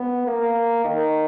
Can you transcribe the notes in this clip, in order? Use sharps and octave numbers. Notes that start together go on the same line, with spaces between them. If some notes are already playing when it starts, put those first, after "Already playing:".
Already playing: B3
A#3
D#3